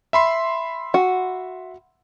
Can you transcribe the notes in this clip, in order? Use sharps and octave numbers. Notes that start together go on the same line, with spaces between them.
E5 B5 C6
F#4